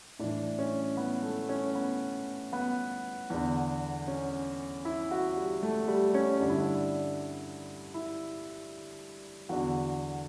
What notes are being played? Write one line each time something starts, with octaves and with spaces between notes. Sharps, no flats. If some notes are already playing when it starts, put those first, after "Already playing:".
A2 E3 D4
C#4
B3
A3
C#4
B3
B3
E2 D3
C#4
E4
F#4
G3
A3
G3
C#4
G2 D3 D4
E4
D4
E4
E2 D3 F#4